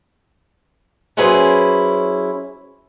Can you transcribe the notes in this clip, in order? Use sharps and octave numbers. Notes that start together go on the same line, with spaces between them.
F#3 C#4 E4 G#4 B4 C5